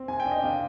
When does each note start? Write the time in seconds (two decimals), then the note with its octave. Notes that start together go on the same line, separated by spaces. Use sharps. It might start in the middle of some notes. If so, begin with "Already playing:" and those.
Already playing: C4
0.08 C3 G#5
0.20 G5
0.25 D4
0.31 D#5
0.43 C3 F5